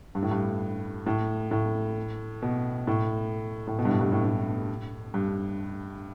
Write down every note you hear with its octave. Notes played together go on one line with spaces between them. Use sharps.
G2
A2
G2
A2
A2
B2
A2
A2
B2
G2
A2
G2
A2
A2
G2